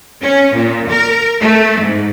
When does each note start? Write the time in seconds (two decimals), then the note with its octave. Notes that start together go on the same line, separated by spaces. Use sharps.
0.23 C#4
0.55 A#2
0.90 A#4
1.40 A3
1.80 G#2